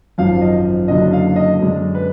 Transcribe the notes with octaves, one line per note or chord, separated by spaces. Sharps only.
G#1 F#2 F3 F5
D#5
F#1 F#2 D3 F#3 D4 D#5
F5
D#5
F#2 D3 G#3 D4
B4